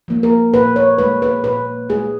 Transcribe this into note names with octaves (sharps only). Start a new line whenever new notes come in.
F3 A#3
A#4
A#2 B4
C#5
G#3 B4
B4
A#2 B4
G#3 G#4